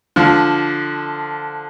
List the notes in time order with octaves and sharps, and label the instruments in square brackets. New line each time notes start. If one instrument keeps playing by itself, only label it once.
[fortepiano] D3 F3